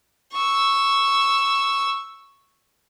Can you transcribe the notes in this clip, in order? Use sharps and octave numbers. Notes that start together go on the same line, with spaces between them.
C#6 E6